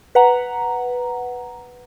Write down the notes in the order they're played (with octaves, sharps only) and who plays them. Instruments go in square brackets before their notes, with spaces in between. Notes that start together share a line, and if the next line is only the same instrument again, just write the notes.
[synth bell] B4 F#5 A#5